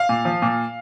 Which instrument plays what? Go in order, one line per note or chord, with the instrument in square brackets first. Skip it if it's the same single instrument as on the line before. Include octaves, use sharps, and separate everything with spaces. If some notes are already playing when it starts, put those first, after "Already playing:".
Already playing: [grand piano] F5
A#2
F3
A#2